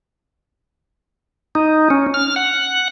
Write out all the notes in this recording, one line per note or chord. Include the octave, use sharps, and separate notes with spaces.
D#4
C#4
F6
F#5